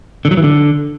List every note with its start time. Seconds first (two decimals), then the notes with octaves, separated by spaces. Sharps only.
0.25 D3
0.31 F#3
0.37 E3
0.44 D3